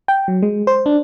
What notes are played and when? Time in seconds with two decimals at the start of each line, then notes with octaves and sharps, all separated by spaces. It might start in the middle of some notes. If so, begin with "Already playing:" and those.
0.08 G5
0.28 F#3
0.42 G#3
0.67 C5
0.86 D4